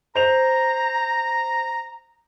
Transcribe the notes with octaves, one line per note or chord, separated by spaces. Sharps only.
C5 A#5 F7